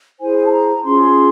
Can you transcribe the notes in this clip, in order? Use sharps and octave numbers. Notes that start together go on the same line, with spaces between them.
E4 G#4 C5 G#5
G#5
A5
A#5
C#4 F4 G#4 C6